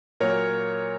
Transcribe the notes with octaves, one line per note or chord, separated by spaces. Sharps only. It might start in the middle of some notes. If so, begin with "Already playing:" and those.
A#2 F#3 A#3 A#4 C#5